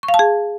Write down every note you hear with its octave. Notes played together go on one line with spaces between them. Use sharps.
C#6
F5
A5
G#4